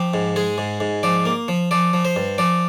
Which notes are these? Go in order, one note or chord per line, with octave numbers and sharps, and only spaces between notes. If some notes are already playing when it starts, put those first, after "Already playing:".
Already playing: F3 G4
G#2
G#3 G#4
G#2
G#2
F3 D5
A#3
F3
F3 D5
F3
C5
G2
F3 D5